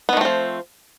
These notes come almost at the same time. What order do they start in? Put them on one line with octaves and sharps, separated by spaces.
B3 D#3 A3 C4 F3